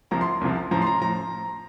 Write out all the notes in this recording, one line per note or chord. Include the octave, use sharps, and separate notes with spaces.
C2 C3 F3 A#5
C6
C2 C3 F3
A1 A2 F3 A#5
C6
A#5
A2 F3 A#5